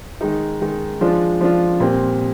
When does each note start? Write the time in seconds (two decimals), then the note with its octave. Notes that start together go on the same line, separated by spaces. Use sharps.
0.21 D#3 G#3 D#4
0.61 D#3 G#3 D#4
1.01 F3 G#3 D4 F4
1.41 F3 G#3 D4 F4
1.80 A#2 G3 C4